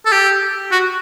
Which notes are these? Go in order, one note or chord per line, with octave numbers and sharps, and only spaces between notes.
A4
G4
F#4